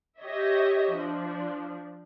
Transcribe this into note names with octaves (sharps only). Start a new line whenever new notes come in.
G4 C#5 D#5 E5
F3 D4